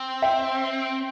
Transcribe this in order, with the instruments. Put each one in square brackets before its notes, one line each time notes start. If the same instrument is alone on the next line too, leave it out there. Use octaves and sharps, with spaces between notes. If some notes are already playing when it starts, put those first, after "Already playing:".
Already playing: [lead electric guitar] C4
[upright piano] E5 G5